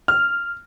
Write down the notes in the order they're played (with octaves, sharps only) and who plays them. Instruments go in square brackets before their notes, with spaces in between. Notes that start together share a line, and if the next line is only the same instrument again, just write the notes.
[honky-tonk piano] F6